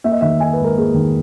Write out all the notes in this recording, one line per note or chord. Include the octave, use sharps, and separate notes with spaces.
A#3 E5
D#5
D#3 E5
D#4 G#5
B4
G#2
A#4
A#3 G#4
D#3